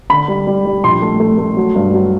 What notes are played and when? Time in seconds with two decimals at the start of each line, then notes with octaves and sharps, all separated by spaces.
0.10 D3 B5
0.28 G3
0.47 G3
0.66 G3
0.84 A#1 C6
1.02 A3
1.20 A3
1.39 A3
1.57 F#3
1.76 G2
1.94 F#3